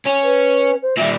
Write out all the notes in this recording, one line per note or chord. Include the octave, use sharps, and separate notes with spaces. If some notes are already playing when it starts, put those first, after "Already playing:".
C#4
B4
C5
A#2 G3 E5